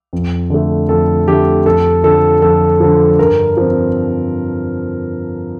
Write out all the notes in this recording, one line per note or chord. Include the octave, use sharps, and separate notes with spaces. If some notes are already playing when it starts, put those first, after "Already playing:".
F2
D3 A3
F2 A4
D3 A3 G4
F2 A4
D3 F3 A4
F2 A4
D3 F3
G2 A#4
F3 C4